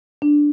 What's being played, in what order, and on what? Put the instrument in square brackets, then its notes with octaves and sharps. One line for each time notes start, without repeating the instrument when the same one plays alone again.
[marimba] D4